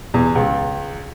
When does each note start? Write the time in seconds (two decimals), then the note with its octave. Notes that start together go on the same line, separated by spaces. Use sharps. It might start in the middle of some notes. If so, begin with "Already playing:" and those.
0.14 E2
0.35 C#2